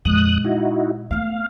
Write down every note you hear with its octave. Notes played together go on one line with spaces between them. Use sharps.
F2 A#2 G#3 D#6 F#6
D#4 E4 F#4
A3 B3 F5